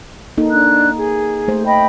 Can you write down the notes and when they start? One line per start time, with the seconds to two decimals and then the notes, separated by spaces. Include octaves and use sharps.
0.37 A#3 D#4 A4
0.51 D4 F#6
0.98 G#4
1.48 A3 C5
1.66 D#5 G5 B5